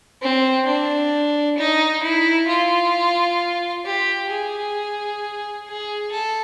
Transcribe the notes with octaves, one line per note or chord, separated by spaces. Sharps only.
C4
D4
D#4
E4
F4
G4
G#4
G#4
A4